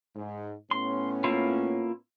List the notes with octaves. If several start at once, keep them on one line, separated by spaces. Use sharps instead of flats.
G#2
A2 B3 C#4 C6
A#3 E4 F4